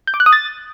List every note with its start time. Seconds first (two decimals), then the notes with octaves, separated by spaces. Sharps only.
0.07 G6
0.14 D6
0.20 F#6
0.26 D#6
0.33 A6